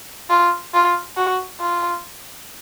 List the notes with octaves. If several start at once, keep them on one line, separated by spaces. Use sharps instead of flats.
F4
F4
F#4
F4